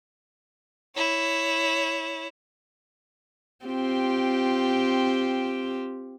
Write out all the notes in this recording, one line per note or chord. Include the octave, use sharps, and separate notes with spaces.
E4 C#5
C4 F4 G4